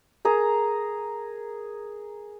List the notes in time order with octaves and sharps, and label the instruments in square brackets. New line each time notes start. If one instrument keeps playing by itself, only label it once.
[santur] G#4 A#4 A#5